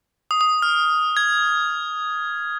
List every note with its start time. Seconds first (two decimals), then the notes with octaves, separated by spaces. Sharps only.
0.31 D#6
0.41 D#6
0.62 F6
1.17 G#6